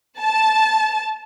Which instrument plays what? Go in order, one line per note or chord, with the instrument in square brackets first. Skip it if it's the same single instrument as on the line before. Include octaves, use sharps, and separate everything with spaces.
[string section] A5